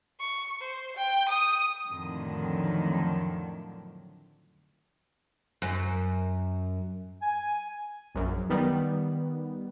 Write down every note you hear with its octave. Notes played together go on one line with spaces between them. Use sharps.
C#6
C5
G5
D#6
F2 A2 D3 D#3 F3 F#3
F#2
G#5
A#1 F#2
D#3 G3 B3